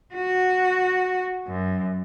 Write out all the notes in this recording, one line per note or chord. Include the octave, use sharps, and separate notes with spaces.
F#4
F#2